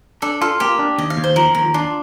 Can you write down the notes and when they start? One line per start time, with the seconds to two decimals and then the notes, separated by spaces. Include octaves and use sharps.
0.22 D4 A4
0.41 F4 A4
0.60 A#3 G4
0.79 D4
0.98 D#2 D#5
1.10 F5
1.17 D#2
1.24 C5
1.36 F3 A#4
1.55 D#2 A#4
1.74 D4 F4